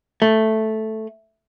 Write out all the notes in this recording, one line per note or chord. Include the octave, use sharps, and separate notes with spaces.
A3